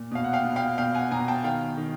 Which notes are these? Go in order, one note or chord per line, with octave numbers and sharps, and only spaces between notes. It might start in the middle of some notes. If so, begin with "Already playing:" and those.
Already playing: A#2
B2 F5
F#5
F5 G5
B2
F5 G5
B2 F5 G5
F#5 G#5
B2 G#5 A#5
G5 A5
D#3 F5 G5
D#3